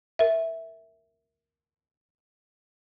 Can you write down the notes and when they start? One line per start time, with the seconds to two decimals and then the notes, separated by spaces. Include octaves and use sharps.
0.19 A#4 E5